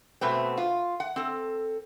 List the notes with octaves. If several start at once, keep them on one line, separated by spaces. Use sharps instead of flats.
B2 A3 B3 C4
F4
F#5
C4 A4